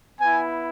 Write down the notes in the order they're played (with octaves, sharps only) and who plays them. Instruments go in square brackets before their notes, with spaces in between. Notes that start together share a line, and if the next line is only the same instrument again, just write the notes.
[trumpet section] B3 E4 G#5